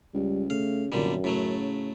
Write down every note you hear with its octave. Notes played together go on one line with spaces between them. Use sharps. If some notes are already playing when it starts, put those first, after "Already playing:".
C#2 G3
C#3 A3 F5
F1 F#2 A#2 D3 G3
A2 C#3 F#3 A3